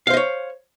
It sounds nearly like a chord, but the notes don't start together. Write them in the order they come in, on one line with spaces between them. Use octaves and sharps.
F5 C5 D#5 C#5